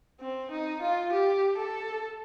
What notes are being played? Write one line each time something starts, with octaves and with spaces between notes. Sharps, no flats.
C4
D#4
F4
G4
A4